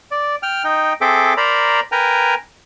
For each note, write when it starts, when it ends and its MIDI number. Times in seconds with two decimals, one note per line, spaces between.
0.11 0.36 74
0.43 0.64 79
0.43 0.64 89
0.64 0.93 63
0.64 0.93 79
1.01 1.34 60
1.01 1.34 68
1.01 1.34 69
1.01 1.34 76
1.01 1.34 79
1.01 1.34 86
1.37 1.80 70
1.37 1.80 72
1.37 1.80 74
1.37 1.80 82
1.37 1.80 83
1.92 2.35 70
1.92 2.35 71
1.92 2.35 79
1.92 2.35 80
1.92 2.35 82